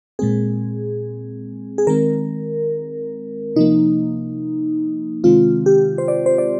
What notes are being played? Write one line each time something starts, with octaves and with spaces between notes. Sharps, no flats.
A#2 G#3 C4 G#4
G#4
D#3 G#3 C4 A#4
C3 F3 A#3 D#4
C3 D#3 G#3 C4 F4
G4
C5
D5
C5
D5